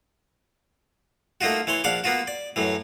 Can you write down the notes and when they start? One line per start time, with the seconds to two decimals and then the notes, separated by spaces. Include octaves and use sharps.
1.41 A3 A#3 D#4 F4 F#4
1.67 E3 C#5 C6
1.84 A#1 D4 F5 F#5 D6
2.04 A#3 B3 F4 F#4
2.27 D5
2.56 F#2 A2 E3